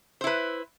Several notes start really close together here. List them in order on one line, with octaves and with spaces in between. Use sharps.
C5 E4 B4